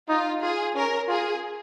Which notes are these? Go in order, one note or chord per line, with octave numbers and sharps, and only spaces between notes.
D#4 F4
F4 G#4
C#4 A#4
F4 G#4